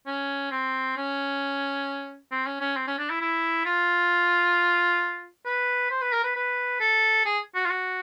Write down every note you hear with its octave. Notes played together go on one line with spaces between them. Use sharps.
C#4
C4
C#4
C4
C#4
C#4
C4
C#4
D4
E4
E4
F4
B4
C5
B4
A#4
B4
B4
A4
G#4
F#4
F4
F#4